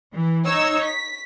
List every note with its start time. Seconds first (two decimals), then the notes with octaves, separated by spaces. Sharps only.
0.15 E3
0.46 D#4 C#5 E6
0.83 B6